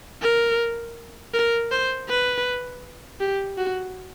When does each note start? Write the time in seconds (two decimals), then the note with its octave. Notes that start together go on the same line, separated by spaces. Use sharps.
0.22 A#4
1.34 A#4
1.71 C5
2.09 B4
3.20 G4
3.58 F#4